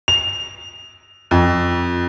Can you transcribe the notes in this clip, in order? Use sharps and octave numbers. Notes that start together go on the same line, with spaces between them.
F7
F2